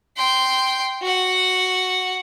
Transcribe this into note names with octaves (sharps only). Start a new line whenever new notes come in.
G5 C6
F#4 F#5